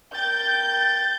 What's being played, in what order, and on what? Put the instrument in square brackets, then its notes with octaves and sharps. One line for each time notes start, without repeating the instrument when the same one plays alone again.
[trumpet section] A#4 G5 [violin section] G6 [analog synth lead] A6